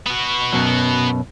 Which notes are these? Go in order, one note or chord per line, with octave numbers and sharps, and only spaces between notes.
B3 F#4
F#2 B2 F#3